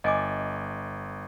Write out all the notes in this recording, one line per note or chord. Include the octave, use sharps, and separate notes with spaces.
G1 D#5 G#5 D6